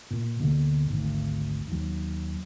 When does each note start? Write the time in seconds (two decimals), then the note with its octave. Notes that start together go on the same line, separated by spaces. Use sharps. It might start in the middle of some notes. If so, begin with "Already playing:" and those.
0.11 A#2
0.39 D2 B2 D3 A#3
0.89 G#1 D2
1.68 D#2 F#3